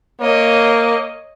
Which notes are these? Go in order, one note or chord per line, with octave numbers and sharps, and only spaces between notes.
A#3 C#5 D#5